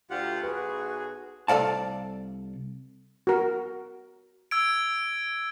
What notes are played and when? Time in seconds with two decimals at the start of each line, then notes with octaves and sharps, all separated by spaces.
0.10 D2 F4 G4 F#5
0.43 B1 F#4 G#4 B4
1.48 C2 A4 D5 F5 A5
3.27 F#4 A#4
4.51 E6 G#6 D7